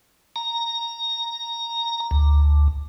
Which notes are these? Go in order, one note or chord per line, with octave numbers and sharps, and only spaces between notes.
A#5
D2